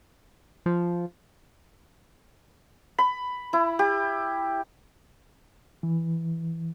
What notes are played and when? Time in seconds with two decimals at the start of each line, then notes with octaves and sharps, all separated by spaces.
0.66 F3
2.98 B5
3.53 E4
3.79 G4
5.83 E3